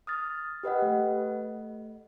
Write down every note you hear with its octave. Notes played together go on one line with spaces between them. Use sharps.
D#6 F6 A6
G4 B4 D#5 F#5
A3